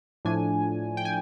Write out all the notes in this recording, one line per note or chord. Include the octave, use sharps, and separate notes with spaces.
A2 F3 A3 D4 G#5
G5
G#5